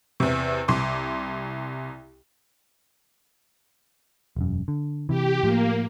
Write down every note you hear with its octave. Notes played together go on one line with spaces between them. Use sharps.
E2 C3
C2 C6 D6
E1 F#2
D3
C3 E3 G4
A2 F3 A#3